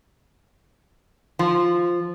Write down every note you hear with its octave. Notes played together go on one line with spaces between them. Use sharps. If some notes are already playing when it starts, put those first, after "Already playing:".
F3